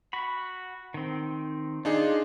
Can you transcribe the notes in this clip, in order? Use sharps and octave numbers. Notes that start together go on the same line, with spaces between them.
F#4 F#5 B5
D#3 C4
D4 D#4 F4 G#4